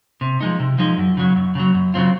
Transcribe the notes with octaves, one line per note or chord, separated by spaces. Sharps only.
C3
F3 G#3 D#4
C3
F3 G#3 D#4
F#2
C#3 F#3
F#2
C#3 F#3
F#2
C#3 F#3 C4 F4